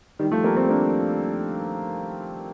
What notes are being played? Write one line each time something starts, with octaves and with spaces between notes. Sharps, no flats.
D#3 G3
F3 A3
G3 A#3
A3 C4
A#3 D4